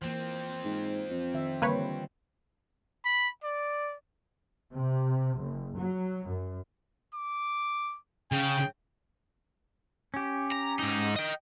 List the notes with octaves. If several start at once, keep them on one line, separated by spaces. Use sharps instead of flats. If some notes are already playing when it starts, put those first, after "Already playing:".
E3 F3 A#3 C4
G#2
F2
D#3 E5
D3 E3 G3 A#3 B4 C#5
B5
D5
C3
F#1
F#3
F#2
D6
C#3 G5
C#4 G4
A#5
G#2 D#4
D#5 G5